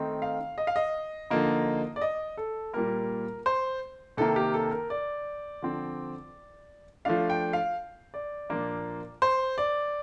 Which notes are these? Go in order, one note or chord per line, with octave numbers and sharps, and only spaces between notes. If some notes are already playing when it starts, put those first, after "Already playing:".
Already playing: D#3 A3 C4 D#4
F5
D#5
F5
D#5
D3 F3 A#3 D#4
D5
D#5
A4
A#2 G3 A#3 A#4
C5
C3 D#3 A#3 A4
G4
A4
A#4
D5
D3 F3 C4
F3 A3 D4 F5
G5
F5
D5
A#2 F3 A#3 D4
C5
D5